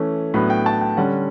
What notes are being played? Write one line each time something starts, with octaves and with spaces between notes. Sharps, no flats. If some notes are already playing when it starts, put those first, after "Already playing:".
Already playing: E3 A3 C#4
A2 F#3 B3 D4 B5
G5
A5
G5
D3 G3 C#4 F#5